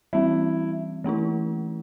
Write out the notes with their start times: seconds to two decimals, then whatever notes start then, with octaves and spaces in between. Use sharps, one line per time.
0.13 E3 G3 C4 E4
1.04 E3 A3 C#4 E4